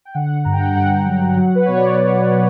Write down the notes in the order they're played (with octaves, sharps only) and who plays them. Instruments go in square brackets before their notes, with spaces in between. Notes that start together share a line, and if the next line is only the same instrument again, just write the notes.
[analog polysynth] G5
D3 F#5
G2 A#5
G5
F#5
G5
G2 F#5
F#3
F#3
B4
B2 C#5
D5